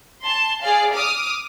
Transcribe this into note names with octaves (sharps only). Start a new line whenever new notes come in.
A5 C6
G#4 D5 F5
D6 D#6 F6